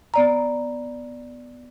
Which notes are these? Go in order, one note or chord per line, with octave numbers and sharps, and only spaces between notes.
B3 D5 A#5